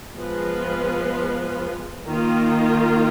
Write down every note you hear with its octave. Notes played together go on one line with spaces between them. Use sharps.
F3 G#3 B3 F4 B4
D#3 A#3 F4